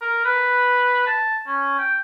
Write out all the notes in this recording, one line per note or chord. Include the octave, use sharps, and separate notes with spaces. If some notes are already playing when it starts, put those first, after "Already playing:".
A#4
B4
A5
C#4
G5